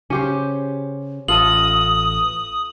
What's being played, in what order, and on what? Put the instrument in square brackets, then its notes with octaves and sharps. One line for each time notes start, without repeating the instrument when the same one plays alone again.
[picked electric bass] C#3 [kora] C#4 G4 C5
[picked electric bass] A1 [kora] F4 A4 D#5 [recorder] D#6 [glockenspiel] F#7